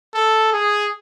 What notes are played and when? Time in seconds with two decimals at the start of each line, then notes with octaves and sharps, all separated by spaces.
0.14 A4
0.52 G#4